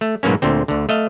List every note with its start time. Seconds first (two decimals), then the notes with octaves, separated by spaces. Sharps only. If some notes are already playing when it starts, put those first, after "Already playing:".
0.01 A3
0.23 G#2 B2 F#3 A#3 C#4
0.42 D2 A#2 D3 C4
0.68 D2 D3
0.89 A3 D#5 F5